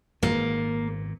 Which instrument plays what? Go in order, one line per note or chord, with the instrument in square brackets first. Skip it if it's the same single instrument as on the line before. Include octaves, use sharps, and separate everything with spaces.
[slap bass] G#1 A#2 [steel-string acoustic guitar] A#3